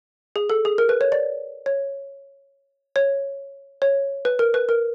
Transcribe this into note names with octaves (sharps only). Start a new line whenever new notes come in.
G#4
A4
G#4
A#4
B4
C#5
D5
C#5
C#5
C#5
B4
A#4
B4
A#4